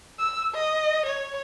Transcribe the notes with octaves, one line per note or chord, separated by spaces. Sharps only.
E6
D#5
C#5